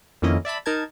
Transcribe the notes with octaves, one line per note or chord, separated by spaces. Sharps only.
F2 D#3 A#3 C#4 E4 D#5
D5 E5 A5 B5
D#4 A#4 A5 G#6